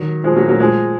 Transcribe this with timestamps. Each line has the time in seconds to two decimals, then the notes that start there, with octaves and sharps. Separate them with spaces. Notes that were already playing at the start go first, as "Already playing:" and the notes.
Already playing: D#3 F#3
0.24 F3 G#3
0.36 F#3 A#3
0.48 F#3 A#3
0.60 F3 G#3